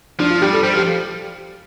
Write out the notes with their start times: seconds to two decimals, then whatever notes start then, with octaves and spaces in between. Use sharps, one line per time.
0.19 F3 D4
0.30 F4
0.42 G3 G4
0.53 A4
0.63 G3 C5
0.74 F3
0.77 G4